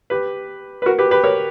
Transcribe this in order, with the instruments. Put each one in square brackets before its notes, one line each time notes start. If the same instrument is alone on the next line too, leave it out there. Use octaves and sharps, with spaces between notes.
[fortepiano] G4 B4
B4
F#4 A#4
G4 B4
G4 B4
A#4 C#5